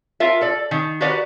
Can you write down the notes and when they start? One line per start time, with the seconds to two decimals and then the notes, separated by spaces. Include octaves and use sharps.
0.20 F4 A#4 E5
0.41 A4 D5
0.71 D#3
1.01 F#4 G4 A#4 B4 D5 F#5